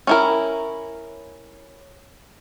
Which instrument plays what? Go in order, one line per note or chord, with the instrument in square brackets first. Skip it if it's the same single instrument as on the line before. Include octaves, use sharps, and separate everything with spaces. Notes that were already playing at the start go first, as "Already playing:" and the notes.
[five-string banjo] C#4 E4 A#4